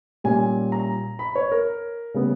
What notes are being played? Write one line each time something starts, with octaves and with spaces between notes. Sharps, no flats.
A#2 G3 C#4 G#5
A#5
B5
C#5
A#4
C#3 G3 B3